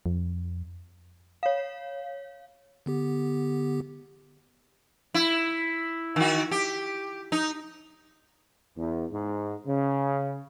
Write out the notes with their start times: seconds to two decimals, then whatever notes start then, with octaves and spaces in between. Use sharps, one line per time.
0.06 F2
1.43 C#5 F5
2.86 D3 B3 G4
5.14 E4
6.16 D#3 F#4
6.51 G4
7.32 D#4
8.77 E2
9.12 G#2
9.67 C#3